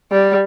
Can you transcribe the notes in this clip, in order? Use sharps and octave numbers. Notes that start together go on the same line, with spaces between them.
G3